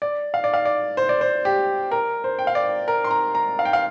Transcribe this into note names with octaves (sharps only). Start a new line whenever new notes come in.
D5
F5
D5
F5
D5
C5
D5
C5
G4
A#4
C5
G5
F5
D5
A#4
C6
A#5
A#5
F5
G5
F5